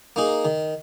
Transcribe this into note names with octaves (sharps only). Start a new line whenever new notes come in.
A#3 D#4 G#4
D#3